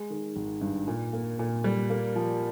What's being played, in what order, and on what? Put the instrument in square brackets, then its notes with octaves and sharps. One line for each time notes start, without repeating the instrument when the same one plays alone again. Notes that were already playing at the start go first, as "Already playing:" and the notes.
Already playing: [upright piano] G#3
D#3
G#1
G2
A#2
A#3
A#2
G3
A#3
F3